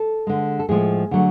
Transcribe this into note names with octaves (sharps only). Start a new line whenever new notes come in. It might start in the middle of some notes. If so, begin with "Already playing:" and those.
Already playing: A4
D3 G#3
A4
A2 F3 G#3 G#4
D3 F#3 A3